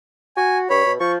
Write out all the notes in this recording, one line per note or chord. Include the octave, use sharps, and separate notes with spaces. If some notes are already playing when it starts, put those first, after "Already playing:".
F#4 G#5
G2 C#5 B5
B2
F3 C#6